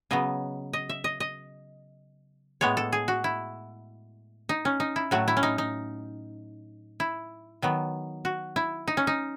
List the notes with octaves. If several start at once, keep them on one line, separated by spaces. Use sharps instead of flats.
C#3 F#3 B3 D#5
D#5
E5
D#5
D#5
A2 G#3 B3 C#5
A4
G#4
F#4
E4
D#4
C#4
D#4
E4
A2 F#3 A3 F#4
E4
C#4
D#4
D#4
E4
D#3 F#3 B3
F#4
E4
D#4
C#4
D#4